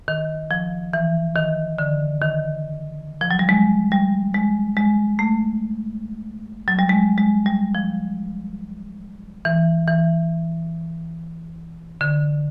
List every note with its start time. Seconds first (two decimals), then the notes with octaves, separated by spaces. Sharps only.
0.08 D#3
0.51 F3
0.93 E3
1.36 D#3
1.79 D3
2.21 D#3
3.21 F3
3.31 F#3
3.39 G3
3.49 G#3
3.92 G3
4.34 G#3
4.77 G#3
5.19 A3
6.68 F#3
6.79 G3
6.89 G#3
7.18 G#3
7.46 G3
7.75 F3
9.45 E3
9.88 E3
12.01 D3